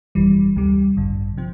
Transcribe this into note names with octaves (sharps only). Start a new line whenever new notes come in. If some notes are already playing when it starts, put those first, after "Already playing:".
G1 F2 E3 G3
D2 C3 G3
A1 G2 D3
C3 F3 C4